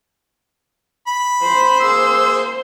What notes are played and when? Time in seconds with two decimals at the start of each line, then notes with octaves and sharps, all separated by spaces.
1.07 B5
1.44 C5
1.80 A#3 G#4 E6